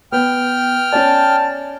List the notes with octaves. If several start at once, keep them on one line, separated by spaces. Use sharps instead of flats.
B3 G5 F6
C#4 D5 A5